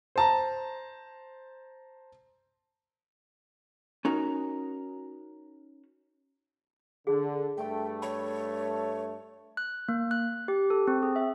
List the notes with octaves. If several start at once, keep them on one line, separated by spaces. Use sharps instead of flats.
C5 A5 A#5
C#4 D#4 F#4 A#4
D3 G#4
G2 A3 G5
C#5 B5
F#6
A#3
F#6
G4
A4
C4
G#4
E5